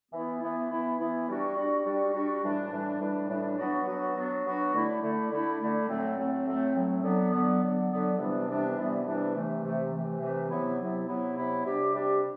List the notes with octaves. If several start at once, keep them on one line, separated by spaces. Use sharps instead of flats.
E3 B3 E4
E3 B3 E4
E3 B3 E4
E3 B3 E4
G3 D4 F#4
G3 D4 F#4
G3 D4 F#4
G3 D4 F#4
A2 E3 G3 D4
A2 E3 G3 D4
A2 E3 G3 D4
A2 E3 G3 D4
F#3 B3 D4 F#4
F#3 B3 D4 F#4
F#3 B3 D4 F#4
F#3 B3 D4 F#4
D3 A3 E4
D3 A3 E4
D3 A3 E4
D3 A3 E4
A2 F#3 A3 C4
A2 F#3 A3 C4
A2 F#3 A3 C4
A2 F#3 A3 C4
D3 F#3 B3
D3 F#3 B3
D3 F#3 B3
D3 F#3 B3
C3 E3 G3 B3 D4
C3 E3 G3 B3 D4
C3 E3 G3 B3 D4
C3 E3 G3 B3 D4
C3 E3 A3
C3 E3 A3
C3 E3 A3
C3 E3 A3
C3 F#3 B3 E4
C3 F#3 B3 E4
C3 F#3 B3 E4
C3 F#3 B3 E4
C3 G3 D4 G4
C3 G3 D4 G4